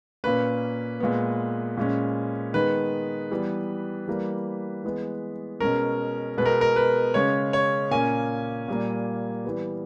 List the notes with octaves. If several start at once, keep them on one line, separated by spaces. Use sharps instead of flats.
A#2 A#3 C#4 B4
A#2 G#3 B3
A#2 G#3 C#4
D#3 G#3 B3 B4
E3 G3 B3
E3 G3 A#3
E3 G#3 B3
B2 G#3 C#4 A#4
B2 G#3 B3 B4
A#4
A#4
B4
C#3 G#3 C#4 C#5
C#5
A#2 A#3 C#4 G#5
A#2 G3 A#3
E3 G3 B3